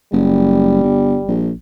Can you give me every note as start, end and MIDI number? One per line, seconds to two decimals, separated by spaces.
0.13 0.83 30
0.13 1.49 55
0.83 1.20 31
1.28 1.52 34